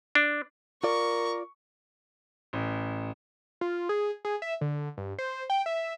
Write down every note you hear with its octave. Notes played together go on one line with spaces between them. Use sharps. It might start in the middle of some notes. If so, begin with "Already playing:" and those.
D4
F4 A#4 D5 C#6
A1
F4
G#4
G#4
E5
D3
G2
C5
G5
E5